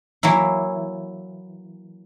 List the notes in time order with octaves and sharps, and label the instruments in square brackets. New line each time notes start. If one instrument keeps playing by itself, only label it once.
[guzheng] E3 F#3 A#3 E4